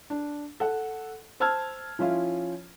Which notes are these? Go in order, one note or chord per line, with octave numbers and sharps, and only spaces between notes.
D4
A4 F#5
C5 A5 E6 F6 G#6
F3 C#4 E4 F4